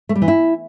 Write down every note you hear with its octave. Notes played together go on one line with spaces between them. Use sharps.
A3
G3
E3
E4